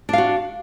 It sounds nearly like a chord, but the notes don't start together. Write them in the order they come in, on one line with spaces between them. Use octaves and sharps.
D4 F5 F#4